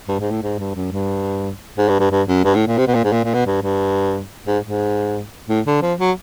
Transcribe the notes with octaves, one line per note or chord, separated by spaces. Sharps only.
G2
G#2
A2
G#2
G2
F#2
G2
G#2
G2
G2
G2
F#2
G2
A2
A#2
C3
B2
A#2
G#2
A#2
A#2
B2
G2
G2
G#2
G#2
A2
D3
F3
F#3